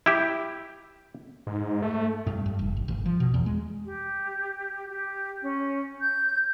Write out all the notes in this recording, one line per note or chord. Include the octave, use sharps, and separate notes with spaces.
E4 G4
G#2
A3
G2
G2
F1
G#1
G1
F3
B2
E2
G#3
G4
G4
C#4
G6